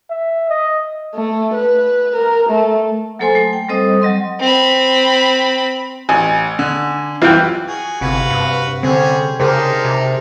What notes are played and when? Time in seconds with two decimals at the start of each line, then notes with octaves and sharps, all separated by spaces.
0.10 E5
0.50 D#5
1.15 A3
1.54 B4
2.16 A#4
2.50 A3
3.19 F#3 A#3 A4 C5 G#5 C6
3.35 A3
3.53 G5
3.69 G3 C4 A4 C5 D#5 D#6
4.02 F#3 G3 D#5 C6
4.40 C4 B5
6.09 A1 G#5
6.59 D3
7.22 C2 F#2 E3 F4 B4 G5
7.67 F#4 G#4
8.01 G1 C3 F#4 B4 F5
8.30 G2
8.83 D3 G3 C4 C#4 G#4
9.40 C#3 D4 D#4 G4 G#4 A#4 C5
9.85 C3